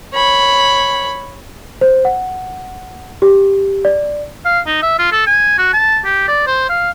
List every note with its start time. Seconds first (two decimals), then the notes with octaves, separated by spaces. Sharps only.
0.14 C#5 B5
1.81 C5
2.05 F#5
3.22 G4
3.85 D5
4.45 F5
4.67 D#4
4.83 E5
4.99 F4
5.12 A4
5.27 G#5
5.58 F#4
5.73 A5
6.05 G4
6.28 D5
6.47 C5
6.69 F5